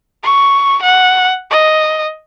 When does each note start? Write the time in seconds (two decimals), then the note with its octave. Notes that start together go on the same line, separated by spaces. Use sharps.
0.23 C#6
0.83 F#5
1.50 D#5